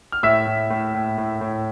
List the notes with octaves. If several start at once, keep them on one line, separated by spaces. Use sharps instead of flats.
F6
A2 E5 E6
A2
A2
A2
A2
A2